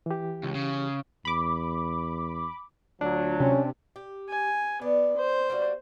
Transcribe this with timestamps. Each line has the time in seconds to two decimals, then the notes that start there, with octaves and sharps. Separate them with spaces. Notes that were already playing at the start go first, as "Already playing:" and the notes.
0.06 E3 G4
0.43 C#2
0.55 C#3
1.25 E2 B5 D6
3.01 D2 F#3 D4 F4
3.40 C3 C#4
3.96 G4
4.29 G#5
4.82 B3 D4
5.17 C5
5.50 G3 A#3 F#4